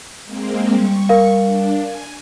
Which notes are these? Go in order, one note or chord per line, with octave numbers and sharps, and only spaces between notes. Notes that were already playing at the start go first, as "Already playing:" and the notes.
G#3 A#3 C4
G3 C#6
A#4 F5
D4
G#5